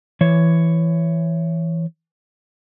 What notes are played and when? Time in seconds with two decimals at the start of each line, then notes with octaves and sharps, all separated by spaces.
0.21 E3 C#5